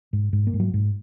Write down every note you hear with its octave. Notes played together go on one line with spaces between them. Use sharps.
G#2
G#2
A#3
G#2
F#3
G#2